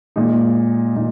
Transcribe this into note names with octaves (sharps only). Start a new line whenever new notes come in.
A#2 G#3 D#4
A#2 D#4